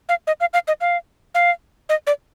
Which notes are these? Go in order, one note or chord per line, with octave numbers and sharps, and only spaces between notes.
F5
D#5
F5
F5
D#5
F5
F5
D#5
D5